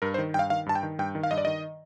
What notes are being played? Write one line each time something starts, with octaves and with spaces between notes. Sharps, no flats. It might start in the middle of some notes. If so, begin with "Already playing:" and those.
G2 A#4
C5
D#3
G2 F5 G5
D#3 F5
G2 A5
G5
D#3
G2 G5
D#3
F5
G2 D#5
D5
D#3 D#5